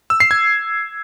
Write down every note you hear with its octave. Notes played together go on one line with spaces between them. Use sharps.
E6
C7
G#6